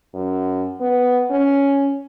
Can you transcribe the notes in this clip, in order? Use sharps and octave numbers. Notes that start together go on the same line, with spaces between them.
F#2
B3
C#4